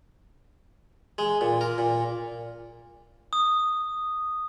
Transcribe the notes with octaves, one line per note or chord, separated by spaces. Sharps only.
G#3
A#2
A#4
A#2
D#6